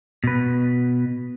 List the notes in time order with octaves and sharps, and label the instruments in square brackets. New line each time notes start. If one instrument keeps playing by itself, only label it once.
[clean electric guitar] B2 B4